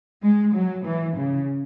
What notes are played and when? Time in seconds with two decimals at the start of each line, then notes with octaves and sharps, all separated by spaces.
0.23 G#3
0.55 F#3
0.85 E3
1.16 C#3